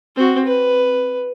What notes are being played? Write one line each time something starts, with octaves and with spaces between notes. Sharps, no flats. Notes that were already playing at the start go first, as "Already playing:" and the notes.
C4 F#4
B4